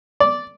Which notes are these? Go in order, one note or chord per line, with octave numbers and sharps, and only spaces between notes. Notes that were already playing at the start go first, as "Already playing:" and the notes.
D5